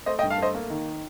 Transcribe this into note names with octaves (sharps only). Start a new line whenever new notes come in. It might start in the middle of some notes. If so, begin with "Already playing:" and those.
A3 C5 D#5
D#5 G5
G2
F5 A5
A3 C5 D#5
A#3
D#3